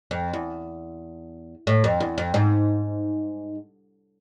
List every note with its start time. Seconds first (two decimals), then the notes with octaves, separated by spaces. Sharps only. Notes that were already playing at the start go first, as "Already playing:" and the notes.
0.11 F2
0.33 E2
1.67 A2
1.84 F2
2.00 E2
2.18 F2
2.34 G#2